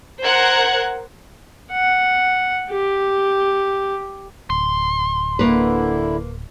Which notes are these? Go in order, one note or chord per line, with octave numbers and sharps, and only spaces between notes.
A#4 C5 F#5 F#6 G#6
F#5
G4
D1 C6
D3 A#3 E4 B4